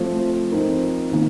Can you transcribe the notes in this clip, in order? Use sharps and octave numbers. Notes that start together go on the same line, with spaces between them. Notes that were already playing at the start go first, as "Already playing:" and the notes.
Already playing: F3 A3 C4
F3 C4 D#4 A#4
D#3 A#3